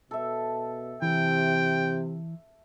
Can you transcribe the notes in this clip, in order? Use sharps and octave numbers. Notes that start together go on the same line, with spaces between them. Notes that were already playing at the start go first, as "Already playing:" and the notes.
B2 A4 E5
C3 E3 G5